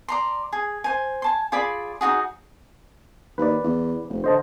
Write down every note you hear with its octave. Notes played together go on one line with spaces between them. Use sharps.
D5 A#5 C6
G#4
C5 G#5
G#5 A5 C6
F4 G#4 D5 B5
D#4 F4 F#4 G#4
D#2 B4 D5
E2
F1
D3 C5 D#5 A5